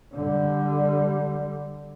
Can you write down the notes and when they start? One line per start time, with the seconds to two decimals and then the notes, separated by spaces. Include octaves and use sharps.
0.13 D3 G3